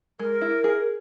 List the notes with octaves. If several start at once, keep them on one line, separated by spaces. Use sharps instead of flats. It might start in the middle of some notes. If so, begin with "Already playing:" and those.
G#3 A#4
E4
G#4